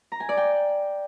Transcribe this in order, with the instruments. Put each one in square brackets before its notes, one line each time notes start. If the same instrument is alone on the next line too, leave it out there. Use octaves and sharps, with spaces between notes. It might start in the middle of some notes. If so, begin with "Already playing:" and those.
[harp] A#5
G#5
D5
G5